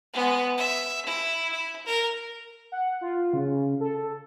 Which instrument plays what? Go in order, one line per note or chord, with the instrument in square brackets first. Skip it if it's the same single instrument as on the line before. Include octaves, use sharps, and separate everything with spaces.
[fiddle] G#3 B3
E5
E4
E4
A#4
[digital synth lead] F#5
F4
C#3
C#3
A4